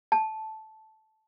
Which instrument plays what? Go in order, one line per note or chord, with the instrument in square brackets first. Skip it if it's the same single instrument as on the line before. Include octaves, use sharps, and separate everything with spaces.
[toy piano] A5